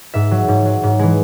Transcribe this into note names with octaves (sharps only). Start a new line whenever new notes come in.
G#2 E5
F#3
G#2
F#3
G#2
E3 G#3